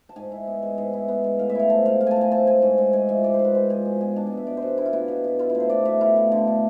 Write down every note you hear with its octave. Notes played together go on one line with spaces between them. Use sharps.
A5
G#2 G#5
E4
B3
G#3
G#2
E4
B3
G#3
A2 F5
E5
E4 F5
C4 A5
G#3 F5
A2 F5
G#5 A5
E4
G#5
C4 A5
G#3 G#5
G#2
G#2
G#3 G#5
F3 E5
G#2 D5
C5
G#2
B4
G#3 C5
F3 G#5
B2
B2 G#5
D4 A5
G#5
B3
E5
B2 D5
C5
B2 B4
D4 E4
F4
B3 E4
B2
B2
E4 F4
E4
A3
C5
B2 D5
B2 E5
E4 F5
A3
D3
D3